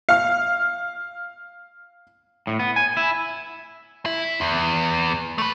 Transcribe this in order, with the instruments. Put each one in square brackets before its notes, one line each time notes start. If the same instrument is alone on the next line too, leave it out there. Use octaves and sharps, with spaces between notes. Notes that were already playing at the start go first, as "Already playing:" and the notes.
[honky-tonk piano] F5 F6
[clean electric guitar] A2
B3
G#5
E4
[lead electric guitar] E4
E2
A3 B4